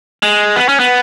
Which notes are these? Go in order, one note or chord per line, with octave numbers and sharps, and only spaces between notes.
G#3
B3
C#4
B3